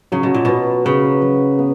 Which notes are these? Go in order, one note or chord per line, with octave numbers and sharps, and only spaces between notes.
C#3 F#3
B2
A#2
B2 B4
C#3 B4
F#3
B3